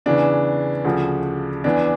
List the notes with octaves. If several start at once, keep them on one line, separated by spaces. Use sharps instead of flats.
E2 C#3 E3 D4
D2 C#3 F3
E2 E3 D4